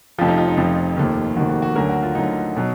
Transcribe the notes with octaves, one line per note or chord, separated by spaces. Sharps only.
F1 F2 F3 F4
D#4
F4
D#4
F1 F2 F3 F4
F1 D#2 D#3
F1 D#2 D#3 F#4
F#4
F#4
D2 D3 F#3 A#4
F#4
F4
D2 D3 F#3 D#4
B2 F#3